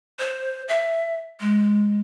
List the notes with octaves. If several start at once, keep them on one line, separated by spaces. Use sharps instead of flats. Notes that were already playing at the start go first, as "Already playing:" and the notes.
C5
E5
G#3